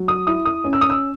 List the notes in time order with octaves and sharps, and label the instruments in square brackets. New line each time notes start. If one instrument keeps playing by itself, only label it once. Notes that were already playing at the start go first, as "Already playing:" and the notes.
Already playing: [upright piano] F#3
D#6
E4 D#6
D#6
C#4
E6
D#6
E6